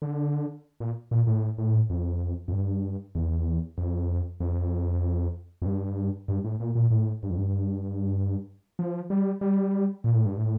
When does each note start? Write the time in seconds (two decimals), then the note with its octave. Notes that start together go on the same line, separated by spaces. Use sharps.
0.02 D3
0.80 A#2
1.11 A#2
1.27 A2
1.58 A2
1.90 F2
2.48 F2
2.53 G2
3.15 E2
3.77 F2
4.40 F2
5.62 F2
5.66 G2
6.28 G2
6.44 A2
6.60 A#2
6.75 A#2
6.91 A2
7.23 G2
7.30 F2
7.38 G2
8.79 F3
9.10 G3
9.41 G3
10.04 A#2
10.15 A2
10.26 G2
10.37 A2